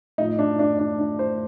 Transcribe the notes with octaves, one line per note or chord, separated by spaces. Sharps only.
A2 F3 D#4
D4
D4
D4
D4
C5